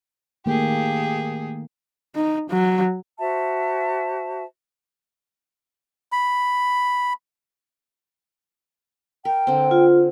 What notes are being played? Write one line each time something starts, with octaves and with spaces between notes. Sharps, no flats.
D#3 A3 A#3 G4 G#4
D#4
F#3
F#4 C5 E5 A5
B5
A#4 G5
D3 C4
F4